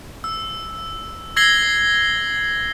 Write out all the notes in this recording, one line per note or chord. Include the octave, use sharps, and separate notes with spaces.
E6
E6 G#6 A#6 C7 F#7 G7